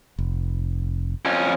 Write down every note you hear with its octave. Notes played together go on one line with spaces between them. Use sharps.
F1
F2 C#4